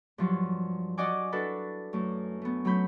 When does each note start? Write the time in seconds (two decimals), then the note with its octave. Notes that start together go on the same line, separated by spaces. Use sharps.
0.18 G2 F3 F#3
0.98 F#4 D5 D#5 F#5 G#5 D6
1.32 D4 E4 F#4 A4 B4
1.93 F#2 A3
2.42 A3 B3
2.65 F#3 A3 C#4 B5 G6